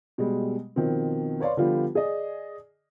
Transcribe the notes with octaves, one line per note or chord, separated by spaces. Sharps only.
B2 G3 G#3
B2 D#3 F3 C4
B4 C#5 D5 F5 C6
D3 F3 G3 B3 F4 G4
G#4 D5 D#5